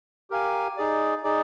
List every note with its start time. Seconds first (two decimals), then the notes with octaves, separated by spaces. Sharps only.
0.30 G4 A#4 F5 G#5
0.77 D#4 G#4 D5
1.24 D#4 G#4 D5